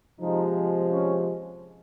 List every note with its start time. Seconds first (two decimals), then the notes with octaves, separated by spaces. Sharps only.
0.19 C3 F3 G#3 D#4
0.91 C#4